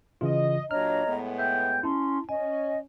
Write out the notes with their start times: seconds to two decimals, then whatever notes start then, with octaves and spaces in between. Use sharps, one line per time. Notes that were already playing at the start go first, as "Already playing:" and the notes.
0.21 C#3 E3 F4 D#5
0.71 A#2 F#3 D4 C#5 D#5 A#5 F6
1.06 A2 G#3 B3
1.39 E5 G5 G6
1.83 C#4 E4 A5 C6
2.29 C#4 D#5 G#5